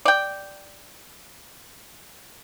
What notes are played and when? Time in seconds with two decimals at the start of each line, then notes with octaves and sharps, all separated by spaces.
0.05 D5 G5